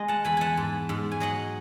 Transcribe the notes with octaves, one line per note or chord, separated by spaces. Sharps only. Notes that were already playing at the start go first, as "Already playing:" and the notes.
Already playing: G#3 D#5
F#5 A5
E2 G#5 B5
F#5 G#5 A5
G#2
G#2
G#5
F#3 D#5 F#5